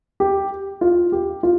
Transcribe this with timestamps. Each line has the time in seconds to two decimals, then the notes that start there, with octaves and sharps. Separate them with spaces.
0.20 G4
0.81 F4
1.12 G4
1.43 F4